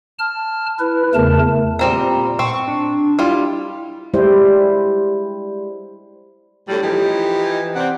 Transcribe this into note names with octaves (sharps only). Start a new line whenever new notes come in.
A5 F6
E4 B4
E2 C#3 A3 A#4 A5
A#2 G3 C4 A#5
C4 C#6
D4
G3 E4 F4
G3 G#3 E4 C5
A2 D3 F#3 G3
E3 F3 D#4 G4
C3 C4 D5 F#5